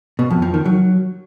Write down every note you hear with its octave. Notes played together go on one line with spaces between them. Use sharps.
B2
F2
F3
D#3
F#3